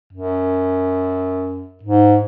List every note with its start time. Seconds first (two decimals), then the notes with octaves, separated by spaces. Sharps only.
0.13 F#2
1.83 G#2